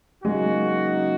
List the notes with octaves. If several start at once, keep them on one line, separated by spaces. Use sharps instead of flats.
C#3 F#3 G#3 A#3 D#4 F#4